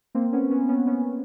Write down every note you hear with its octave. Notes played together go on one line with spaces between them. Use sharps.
A#3 C4
B3 C#4
B3 C#4
B3 C#4
B3 C#4